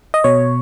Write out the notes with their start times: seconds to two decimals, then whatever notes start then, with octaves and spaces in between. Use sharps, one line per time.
0.14 D#5
0.24 B2 C#5